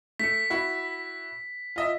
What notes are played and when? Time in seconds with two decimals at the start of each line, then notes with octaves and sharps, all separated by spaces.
0.19 A3 B6 C#7
0.50 E4 F#4
1.76 F4 D#5 E5